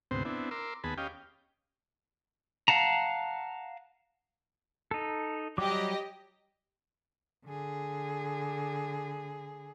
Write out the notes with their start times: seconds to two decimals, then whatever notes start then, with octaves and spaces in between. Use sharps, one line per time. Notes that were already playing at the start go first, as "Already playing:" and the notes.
0.11 D2 G#2 C3 B3 C4 C5
0.25 B3 C4 D4 E4
0.51 A#4 C6 D6 E6
0.84 D#2 B3 G#4 A5 B5
0.98 C#4 G4 D#5 F5 G5
2.68 F5 F#5 A5 A#5
4.91 D#4 A4
5.58 F#3 G3 G4 D#5 D6
7.45 D3 G#4